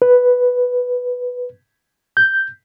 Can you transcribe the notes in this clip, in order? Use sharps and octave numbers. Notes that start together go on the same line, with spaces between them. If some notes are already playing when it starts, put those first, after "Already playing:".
B4
G6